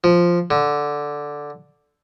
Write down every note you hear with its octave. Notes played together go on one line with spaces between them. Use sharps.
F3
D3